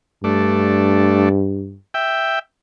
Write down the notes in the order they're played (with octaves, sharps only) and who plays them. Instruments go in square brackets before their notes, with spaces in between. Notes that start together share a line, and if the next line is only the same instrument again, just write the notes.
[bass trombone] G2 [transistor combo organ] A3 D4
[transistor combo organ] E5 G5